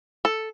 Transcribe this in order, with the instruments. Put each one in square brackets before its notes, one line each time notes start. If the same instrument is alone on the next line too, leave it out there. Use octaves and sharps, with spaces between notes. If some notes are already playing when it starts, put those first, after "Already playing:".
[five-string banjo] A4